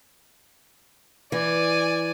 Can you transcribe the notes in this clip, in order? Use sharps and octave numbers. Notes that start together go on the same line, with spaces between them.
E3 D5 G#5